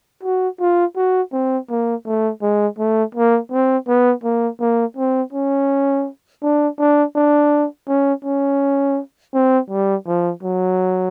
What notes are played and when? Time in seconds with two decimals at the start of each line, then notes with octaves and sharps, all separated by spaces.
0.23 F#4
0.60 F4
0.96 F#4
1.33 C4
1.70 A#3
2.06 A3
2.42 G#3
2.79 A3
3.15 A#3
3.52 C4
3.88 B3
4.24 A#3
4.60 A#3
4.97 C4
5.33 C#4
6.43 D4
6.79 D4
7.16 D4
7.88 C#4
8.24 C#4
9.34 C4
9.70 G3
10.07 F3
10.43 F#3